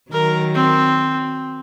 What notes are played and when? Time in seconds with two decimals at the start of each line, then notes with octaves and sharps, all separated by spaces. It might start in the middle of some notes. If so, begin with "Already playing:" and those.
0.12 D#3 F#3 A#4
0.55 C4